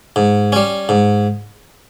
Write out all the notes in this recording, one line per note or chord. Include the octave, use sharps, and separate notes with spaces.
G#2
G3 C#4
G#2